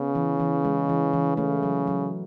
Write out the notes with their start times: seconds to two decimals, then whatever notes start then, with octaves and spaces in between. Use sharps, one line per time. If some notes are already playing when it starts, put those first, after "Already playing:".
Already playing: C#3 B3
0.15 E3
0.40 E3
0.65 G#3
0.89 E3
1.13 E3
1.37 C#3 A3
1.63 F#3
1.87 F#3